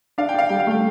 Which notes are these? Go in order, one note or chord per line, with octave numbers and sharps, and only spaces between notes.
D4 F5
G5
D4 F5
G3 G5
F5
A3 G5